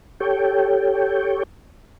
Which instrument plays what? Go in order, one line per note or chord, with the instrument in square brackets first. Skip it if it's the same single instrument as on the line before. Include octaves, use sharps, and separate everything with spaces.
[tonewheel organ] G4 A4 C#5 G5